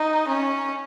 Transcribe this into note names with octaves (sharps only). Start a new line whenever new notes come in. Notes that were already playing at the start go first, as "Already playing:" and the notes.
Already playing: D#4
C#4